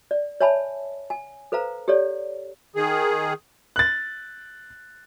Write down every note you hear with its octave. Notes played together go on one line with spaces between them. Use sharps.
D5
C#5 E5 G#5 A5 B5
G#5
A4 B4 C5 F5 A#5
G4 A4 C#5 D5
D#3 G#4
F#6 A6